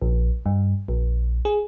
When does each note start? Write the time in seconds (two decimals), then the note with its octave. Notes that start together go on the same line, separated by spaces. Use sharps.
0.02 A#1
0.46 G2
0.88 A#1
1.45 G#4